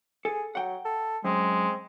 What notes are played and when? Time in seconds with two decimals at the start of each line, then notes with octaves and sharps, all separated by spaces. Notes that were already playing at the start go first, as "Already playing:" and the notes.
0.25 G#4 A4
0.55 F#3 F#5 G5
0.85 A4
1.24 F#2 G#3 C4